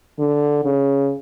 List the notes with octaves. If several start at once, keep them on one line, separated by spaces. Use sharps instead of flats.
D3
C#3